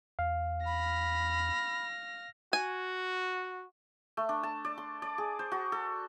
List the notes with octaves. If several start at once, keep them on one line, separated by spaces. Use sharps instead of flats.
E2 F5
B5 F6 A#6
F#4 G#5
A3
D4
A5
D5
C6
D5
G#4
C5
F#4
A4